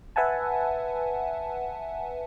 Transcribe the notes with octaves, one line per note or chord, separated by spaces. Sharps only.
B4 E5 F#5 G#5 A5